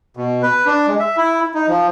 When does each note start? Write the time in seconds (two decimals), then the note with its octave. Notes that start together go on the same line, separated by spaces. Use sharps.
0.17 B2
0.43 B4
0.66 D4
0.87 G#3
0.99 E5
1.17 E4
1.55 D#4
1.68 F3